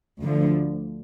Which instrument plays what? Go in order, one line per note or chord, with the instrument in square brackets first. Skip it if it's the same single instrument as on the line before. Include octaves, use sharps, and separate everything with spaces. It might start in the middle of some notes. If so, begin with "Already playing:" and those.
[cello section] D2 D3 F3